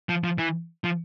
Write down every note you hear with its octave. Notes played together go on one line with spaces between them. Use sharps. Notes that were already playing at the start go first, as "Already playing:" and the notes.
F3
F3
E3
F3